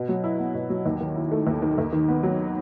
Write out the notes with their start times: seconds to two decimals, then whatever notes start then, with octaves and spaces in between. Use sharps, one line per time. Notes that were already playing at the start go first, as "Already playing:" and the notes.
Already playing: B2
0.09 F#3
0.24 E4
0.39 B3
0.54 B2
0.70 F#3
0.86 D#2
1.01 D#3
1.15 E4
1.32 A3
1.47 D#2
1.62 D#3
1.78 D#2
1.92 D#3
2.08 B3
2.23 F#3